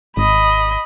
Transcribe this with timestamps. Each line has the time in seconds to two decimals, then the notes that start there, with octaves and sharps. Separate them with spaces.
0.17 G#1 D#5 B5